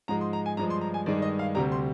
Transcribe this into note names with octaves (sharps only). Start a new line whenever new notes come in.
G#2 F3 G#3 A#5
C6
A#5
G#5
G2 F3 G#3 A#5
C6
A#5
G#5
G2 D#3 G#3 D5
D#5
F5
D2 C3 G3 A#5
C6